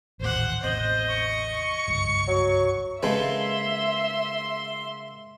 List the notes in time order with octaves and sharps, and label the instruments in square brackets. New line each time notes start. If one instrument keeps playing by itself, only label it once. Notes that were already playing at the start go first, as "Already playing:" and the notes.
[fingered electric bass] A1 D#2 A#2 [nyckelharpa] C5 F#5
[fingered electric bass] A1 E2 C3 [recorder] C5 [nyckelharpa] D#5
[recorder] C#6
[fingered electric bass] F#1 C2 G2
[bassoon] F#3
[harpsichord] C#3 G#3 A#3 [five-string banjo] A4 B4 [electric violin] E5 [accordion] C6